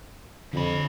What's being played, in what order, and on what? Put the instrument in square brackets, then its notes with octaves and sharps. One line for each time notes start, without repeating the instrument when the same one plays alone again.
[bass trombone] F2 [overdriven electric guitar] D3 B5